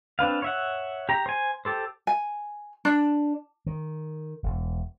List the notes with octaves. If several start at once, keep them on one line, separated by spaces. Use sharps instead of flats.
C4 D4 B4 F5
C#5 E5 F#5
G4 A#5
C5 G#5
G4 A4 C5
G#5
D4
D#3
E1